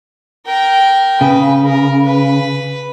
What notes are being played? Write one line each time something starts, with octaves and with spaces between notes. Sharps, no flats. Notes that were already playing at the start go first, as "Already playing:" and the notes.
A#4 G5
C#3 B4
A#4
B4